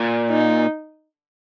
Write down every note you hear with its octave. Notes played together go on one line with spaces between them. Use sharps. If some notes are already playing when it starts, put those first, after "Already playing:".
Already playing: A#2
D#4